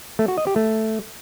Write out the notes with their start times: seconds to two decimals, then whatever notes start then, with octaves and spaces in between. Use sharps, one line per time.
0.19 A3
0.28 F#4
0.38 D#5
0.47 G4
0.56 A3